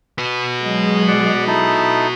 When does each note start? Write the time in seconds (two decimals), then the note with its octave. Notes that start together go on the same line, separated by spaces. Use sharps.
0.18 F#4 B4
0.61 F#3 G#3
1.08 D5 F#5
1.47 D#4 E4 A4